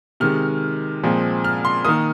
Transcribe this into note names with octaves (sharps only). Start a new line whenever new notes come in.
C3 D#3 G#3 F6
A#2 F3 G#3 C4
F6
C6
D#3 A#3 D#6